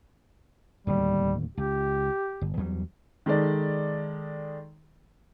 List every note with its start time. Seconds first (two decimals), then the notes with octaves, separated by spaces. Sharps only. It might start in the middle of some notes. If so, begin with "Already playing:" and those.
0.87 D1 D#2 B2 G3
1.57 C#2 G4
2.41 G1
2.57 E2 F#3 G3
3.26 D#3 G#3 A4 D5